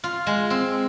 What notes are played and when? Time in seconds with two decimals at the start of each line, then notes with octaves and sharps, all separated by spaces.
0.04 F4
0.27 G#3
0.50 C4